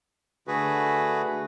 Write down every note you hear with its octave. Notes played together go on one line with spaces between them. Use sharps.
D3 A3 F#4 G#4 B4